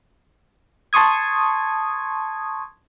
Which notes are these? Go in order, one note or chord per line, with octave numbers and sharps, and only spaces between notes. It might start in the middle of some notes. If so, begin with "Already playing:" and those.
A5 C6 C#6 D#6 G#6